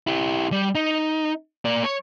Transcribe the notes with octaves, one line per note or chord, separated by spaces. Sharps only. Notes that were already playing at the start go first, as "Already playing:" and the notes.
E4 G4
G3
D#4
A#3 D5
C#5